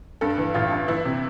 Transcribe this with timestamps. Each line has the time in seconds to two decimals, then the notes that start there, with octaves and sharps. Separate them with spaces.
0.21 G2 A4
0.38 E3
0.54 A1 F4
0.72 G2
0.88 E3 E4
1.05 C3